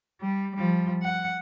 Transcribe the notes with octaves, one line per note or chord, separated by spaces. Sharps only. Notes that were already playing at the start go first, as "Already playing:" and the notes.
G3
F3 G3
F#5